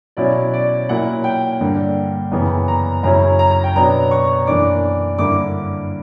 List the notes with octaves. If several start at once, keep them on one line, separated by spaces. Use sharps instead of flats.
B2 F#3 C#4 E4 D5
D5
A#2 F#3 A#3 E4 F#5
G5
G2 D3 A#3
F#2 C#3 E3 B3
A#5
F#2 C#3 F#3 C#4 E4 A#5
A#5
A#5
G5
B2 F#3 B3 D4 A#5
C#6
F#2 E3 A#3 D4 D6
G2 D3 A#3 E4 D6